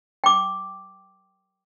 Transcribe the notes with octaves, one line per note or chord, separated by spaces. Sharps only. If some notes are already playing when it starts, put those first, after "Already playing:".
G5 D6